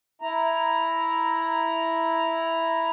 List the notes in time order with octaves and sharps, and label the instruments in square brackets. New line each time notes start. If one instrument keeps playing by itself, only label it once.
[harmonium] E4 A#5